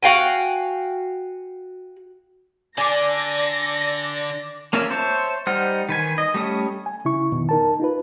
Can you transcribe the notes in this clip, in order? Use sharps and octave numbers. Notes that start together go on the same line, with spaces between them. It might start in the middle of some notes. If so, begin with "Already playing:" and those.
F#4 F5 G5 G#5
D3 D4 D5 G#5 D6 A#6
A#3 C#4 F4 A#4 E5
C5 C#5 E5 A5
G3 D#4 C5 F#5 F6
D#3 B4 G#5
D#5
G3 A3 C#4 D#6
G#5
C#3 E4 C#6
F2 B2 D#3
D#4 A#4 A5
D#4 F4 B4